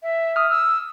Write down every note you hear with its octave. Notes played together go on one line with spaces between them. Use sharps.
E5
D#6 F6
E6